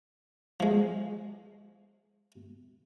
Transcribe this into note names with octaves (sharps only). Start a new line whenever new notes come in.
F3 G#3